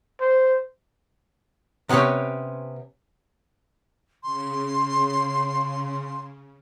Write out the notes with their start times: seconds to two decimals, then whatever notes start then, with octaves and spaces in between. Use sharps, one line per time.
0.20 C5
1.89 C3 B3 C#4 G4 C#5
4.24 C#3 C6